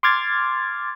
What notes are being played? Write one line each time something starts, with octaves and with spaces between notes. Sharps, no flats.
C6 D6 F6 G#6 A6